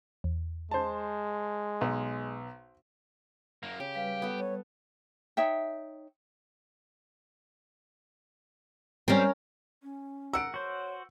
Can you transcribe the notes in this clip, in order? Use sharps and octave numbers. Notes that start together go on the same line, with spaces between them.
E2
G#3 C5 A5
B1
F#2 A#3
C#3 G4
G3 B4 F5
B3 A4
C#5
D#4 C#5 E5 G5
G3 C4 C#4 A#4
C#4
A#4 F#5 E6 D7
F#4 C5 C#5